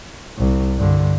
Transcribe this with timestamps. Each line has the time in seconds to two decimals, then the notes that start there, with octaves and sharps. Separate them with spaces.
0.38 C2
0.78 G2 D3